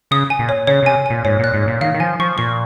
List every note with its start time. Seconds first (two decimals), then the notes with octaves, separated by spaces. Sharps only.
0.11 C#3 D#6
0.30 G#5
0.39 A#2
0.49 C#5
0.67 C#3 C#5
0.83 C3 G#5
1.06 A#2 G#5
1.25 G#2 C#5
1.39 A#2 F#6
1.54 G#2
1.63 A#2 C#5
1.81 D#3 F5
1.94 D#3
2.00 F3 G#5
2.20 F3 C#6
2.38 A#2 C#6